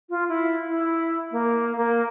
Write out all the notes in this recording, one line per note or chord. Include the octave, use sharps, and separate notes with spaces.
F4
E4
E4
A#3
A#3